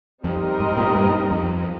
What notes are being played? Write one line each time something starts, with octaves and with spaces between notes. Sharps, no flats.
F2 G3 C4 D#4 A#4 D#5
G#2
A#2
G2
F2